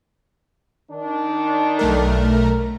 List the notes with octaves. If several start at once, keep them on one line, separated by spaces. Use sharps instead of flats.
D#3 D4
B1 A3 A#4